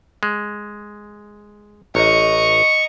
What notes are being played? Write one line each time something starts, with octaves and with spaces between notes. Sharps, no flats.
G#3
A1 D#5 A#5 C#6